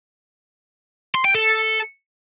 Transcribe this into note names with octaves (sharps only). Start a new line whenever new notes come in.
C6
G5
A4